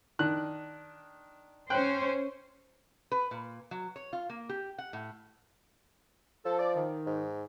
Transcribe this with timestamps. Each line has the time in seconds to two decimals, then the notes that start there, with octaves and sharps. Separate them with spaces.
0.19 D#3 D4 F#6
1.70 C#4 C5 G5 F#6
3.12 B4
3.31 A#2
3.71 F#3
3.96 C#5
4.13 F4
4.30 A#3
4.49 G4
4.78 F#5
4.93 A2
6.45 F3 A4
6.59 D5
6.74 D#3
7.06 G#2